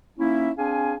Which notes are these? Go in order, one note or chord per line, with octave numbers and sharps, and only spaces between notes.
A#3 C#4 D#4 E4
C4 D4 G#4 F5 G#5